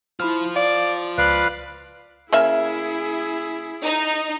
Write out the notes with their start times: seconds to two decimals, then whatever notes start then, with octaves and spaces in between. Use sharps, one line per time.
0.20 E4 F4 C5 B5 F6
0.56 D5 F5
1.18 C#2 B4 D5 F5 F#6
2.33 C#3 A#3 E4 G#4 E5
3.82 D#4